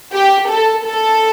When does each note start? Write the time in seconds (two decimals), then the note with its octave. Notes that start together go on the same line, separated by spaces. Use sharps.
0.13 G4
0.49 A4
0.85 A4